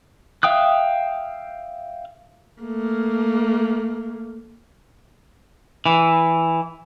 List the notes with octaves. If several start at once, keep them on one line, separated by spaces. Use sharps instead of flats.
E5 F5 G5 D#6 F#6
A3 A#3
E3